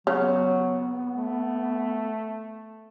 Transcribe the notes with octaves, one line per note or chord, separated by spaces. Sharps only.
C#3 F#3 B3 C#5
A3